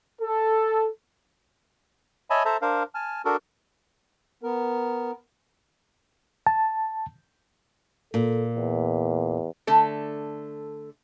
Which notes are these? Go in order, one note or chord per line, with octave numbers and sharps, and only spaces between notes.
A4
C#5 D#5 E5 G#5 A5 B5
A4 C5 E5 A5 A#5
D4 A#4 C5 F5
G#5 A5 F6
D4 F#4 A4 A#4
B3 A#4
A5
A#2 A4
E2
D3 A3 A4